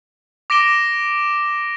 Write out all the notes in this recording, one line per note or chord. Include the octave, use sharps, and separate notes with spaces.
D6 A#6 D7 E7 G7